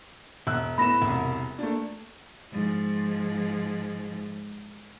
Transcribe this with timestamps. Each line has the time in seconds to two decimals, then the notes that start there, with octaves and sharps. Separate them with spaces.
0.47 E1 E6 F#6
0.78 A2 B3 B5 A#6 E7
1.02 E1 C2
1.59 A3 A#3 D4
2.52 G#2 F3